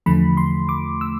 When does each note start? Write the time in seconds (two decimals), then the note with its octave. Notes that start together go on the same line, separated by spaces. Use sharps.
0.06 E2 D3 F3 A3 B5
0.37 C6
0.69 D6
1.01 E6